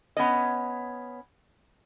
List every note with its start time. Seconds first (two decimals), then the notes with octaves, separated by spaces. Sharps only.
0.17 B3 C#4 D#5